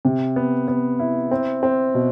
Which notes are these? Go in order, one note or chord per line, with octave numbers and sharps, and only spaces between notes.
C3
B3
B3
E4
C4
C4
B2